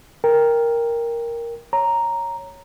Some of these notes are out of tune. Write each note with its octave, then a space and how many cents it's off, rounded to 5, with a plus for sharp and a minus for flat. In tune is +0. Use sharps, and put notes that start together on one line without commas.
A#4 +0 G5 +15
C#5 +0 A#5 +0